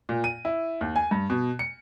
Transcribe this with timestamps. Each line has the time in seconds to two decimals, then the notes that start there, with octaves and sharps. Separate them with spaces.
0.09 A#2
0.24 D#7
0.45 E4
0.81 D#2
0.96 G#5
1.11 G2
1.30 B2
1.59 C#7